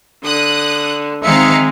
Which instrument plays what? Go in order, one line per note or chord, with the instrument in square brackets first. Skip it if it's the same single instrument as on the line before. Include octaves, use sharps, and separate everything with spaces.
[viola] D3 [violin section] D#6 F#6
[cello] D#3 C4 [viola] G#3 [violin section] D#4 F5 C#7 [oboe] E5